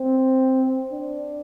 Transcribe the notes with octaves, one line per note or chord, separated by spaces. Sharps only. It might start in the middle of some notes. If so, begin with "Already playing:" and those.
Already playing: C4
D4